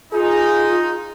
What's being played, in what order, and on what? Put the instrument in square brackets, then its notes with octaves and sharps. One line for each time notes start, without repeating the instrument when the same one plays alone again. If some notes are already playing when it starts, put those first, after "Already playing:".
[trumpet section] D#4 [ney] F4 [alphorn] G#4